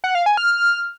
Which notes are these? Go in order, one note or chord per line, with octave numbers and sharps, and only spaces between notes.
F#5
F5
G#5
F6